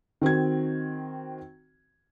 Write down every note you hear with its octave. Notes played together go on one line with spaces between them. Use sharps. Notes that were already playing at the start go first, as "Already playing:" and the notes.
D#3 C4 F#4 G#6